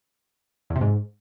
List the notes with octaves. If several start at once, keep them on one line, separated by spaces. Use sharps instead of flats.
E2
C3
G#2